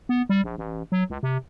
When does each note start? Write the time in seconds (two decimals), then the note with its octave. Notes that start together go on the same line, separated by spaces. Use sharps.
0.09 B3
0.29 G3
0.44 A#1
0.58 A1
0.92 F#3
1.10 C#2
1.23 C3